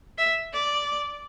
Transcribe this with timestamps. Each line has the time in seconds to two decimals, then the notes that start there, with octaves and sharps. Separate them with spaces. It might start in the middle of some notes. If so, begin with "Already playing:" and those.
0.18 E5
0.53 D5